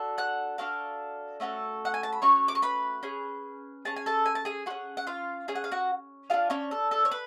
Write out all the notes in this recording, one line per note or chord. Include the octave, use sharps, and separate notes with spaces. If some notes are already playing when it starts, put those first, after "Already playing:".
Already playing: D4 F#4 A4
F#5 F#6
D4 F#4 A4 F5 F6
A3 C#4 F#4 A4
F#5
G#5
A5
B5
A3 C#4 F#4 C#5 C#6
D6
C#6
B4 B5
C#4 G#4
C#4 G#4 A5
G#5
A4 A5
G#5
A5
G#4 G#5
C#4 F#4 G#4 F#5
F#5
F4 F5
C#4 G#4 G#5
F#5
F5
F#4 F#5
D4 F4 G#4 F5
C#4 C#5
A4
A4
C#5
B4